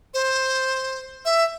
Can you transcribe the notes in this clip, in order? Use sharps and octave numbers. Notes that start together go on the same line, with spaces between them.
C5
E5